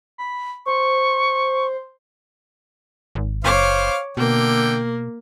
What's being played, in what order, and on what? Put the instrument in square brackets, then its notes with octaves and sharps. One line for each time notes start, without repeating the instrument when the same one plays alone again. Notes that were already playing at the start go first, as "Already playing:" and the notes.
[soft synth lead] B5
[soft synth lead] C5 [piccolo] C#6
[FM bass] G#1
[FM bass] F#1 [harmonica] C5 F5 [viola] C#5 D6
[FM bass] B2 [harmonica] D3 G5 [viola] A#3